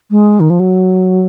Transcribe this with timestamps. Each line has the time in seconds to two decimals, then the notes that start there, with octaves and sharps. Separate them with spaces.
0.11 G#3
0.40 D#3
0.50 F3
0.60 F#3